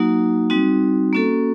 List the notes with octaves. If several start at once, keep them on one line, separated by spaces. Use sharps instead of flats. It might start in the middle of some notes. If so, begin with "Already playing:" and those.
Already playing: F#3 A#3 D#4 F#4
G3 C4 D#4 F#4
A#3 C#4 F#4 A4